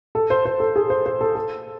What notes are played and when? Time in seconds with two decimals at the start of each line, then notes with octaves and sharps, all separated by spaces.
0.15 A4
0.30 C5
0.45 C5
0.60 A4
0.76 G#4
0.90 C5
1.06 C5
1.21 A4
1.35 A4